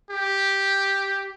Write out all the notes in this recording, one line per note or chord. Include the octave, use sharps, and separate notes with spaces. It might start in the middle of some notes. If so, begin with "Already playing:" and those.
G4